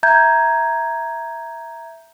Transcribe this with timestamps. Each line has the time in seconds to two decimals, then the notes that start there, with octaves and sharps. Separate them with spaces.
0.03 E5 A#5 G6 G#6